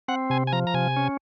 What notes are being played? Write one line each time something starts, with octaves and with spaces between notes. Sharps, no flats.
C4 F#5
C3 G#5
G#5
F3 A#5
A#5
C3 G#5
C#4